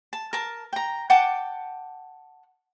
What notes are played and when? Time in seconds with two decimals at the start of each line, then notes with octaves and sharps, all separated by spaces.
0.13 A5
0.33 A#4 A5
0.73 G5 A#5
1.10 F#5 G5 A5 D6